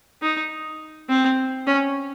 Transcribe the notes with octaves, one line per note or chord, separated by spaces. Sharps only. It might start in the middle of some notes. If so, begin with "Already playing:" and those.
D#4
C4
C#4